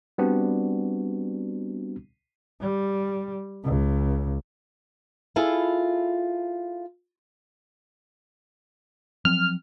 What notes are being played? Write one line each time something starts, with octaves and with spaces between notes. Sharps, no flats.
G3 B3 C4 D4 F#4
G3
C#2
E4 F4 G#4 A4
F3 F#3 C4 F6